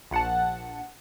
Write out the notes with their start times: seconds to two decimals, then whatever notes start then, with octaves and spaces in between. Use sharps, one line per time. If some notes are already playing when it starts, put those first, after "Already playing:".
0.11 A#1 F#5 A5